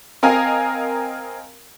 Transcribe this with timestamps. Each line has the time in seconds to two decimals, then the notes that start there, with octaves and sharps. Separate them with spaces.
0.23 C4 A#4 D#5 F5 G#5 A#5